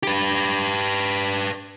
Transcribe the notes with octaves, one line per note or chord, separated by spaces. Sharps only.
G4 B4